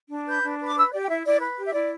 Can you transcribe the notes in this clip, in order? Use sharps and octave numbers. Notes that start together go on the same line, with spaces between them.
D4
B4 G6
D4
B4
D6
B4 E6
G4 D5
G5
E4 E5
E4 D5
B4
G4
E5
E4 D5